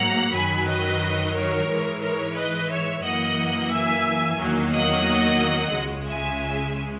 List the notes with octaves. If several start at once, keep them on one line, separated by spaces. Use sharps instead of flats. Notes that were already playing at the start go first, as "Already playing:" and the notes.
Already playing: G#2 F#3 A#3 F#5 A#5
F#2 D#3 F#3 G#5 B5
B4 D#5
A#4 C#5
G#2 E3 G#3
A#4 C#5
B4 D#5
C#5 E5
F#2 E3 A#3 D#5 F#5
E5 G#5
E2 D#3 F#3 A#3
D#5 F#5
C#2 C#3 G#3
E5 G#5